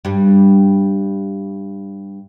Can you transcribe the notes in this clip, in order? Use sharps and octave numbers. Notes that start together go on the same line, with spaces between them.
G2 G3